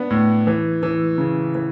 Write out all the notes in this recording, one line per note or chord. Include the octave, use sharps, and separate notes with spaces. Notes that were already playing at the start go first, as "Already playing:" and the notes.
Already playing: B3 D4
A2
E3
E3
C#3
E3